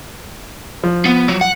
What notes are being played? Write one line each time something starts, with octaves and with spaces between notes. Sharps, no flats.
F3
B3
F#3
F#5